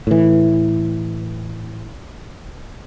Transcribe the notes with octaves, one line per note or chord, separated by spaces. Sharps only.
A2 E3